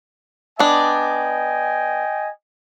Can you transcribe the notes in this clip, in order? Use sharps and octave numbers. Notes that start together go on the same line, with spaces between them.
B3 D4 D#5 G5 G#5